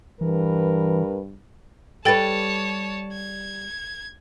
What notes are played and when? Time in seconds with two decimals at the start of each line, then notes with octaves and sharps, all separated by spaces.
0.21 G2 E3 A#4 B4
2.05 G3 A4 B4 C#5 G5 A5 A6
3.13 G#6